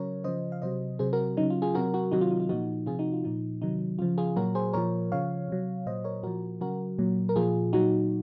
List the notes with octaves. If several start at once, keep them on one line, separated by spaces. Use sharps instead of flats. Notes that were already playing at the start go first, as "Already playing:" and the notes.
Already playing: C#3 F#3 A#4 C#5
C#3 F3 C5 D#5
F5
C3 F#3 C5 D#5
C3 F#3 G#4 C5
F#4 A#4
C#3 F#3 D#4
F4
F4 G#4
C3 F#3 F#4 A#4
F#4 A#4
C3 D#3 F#3 D#4 F#4
F4
D#4
F4
A#2 F3 D#4 F#4
C3 F3 F4 G#4
D#4 F#4
F4
A#2 F3 D#4
C3 D#3 F#3 D#4
C#3 F3 F4
F4 G#4
A#2 F#3 F#4 A#4
G#4 C5
A#2 F3 A#4 C#5
C#3 F3 C#5 F5
C3 F#3
A#2 F#3 C5 D#5
A#4 C#5
A#2 F3 F#4 A#4
C#3 F#3 F#4 A#4
A#2 F#3
A#4
A#2 F3 F4 G#4
A#2 F#3 D#4 F#4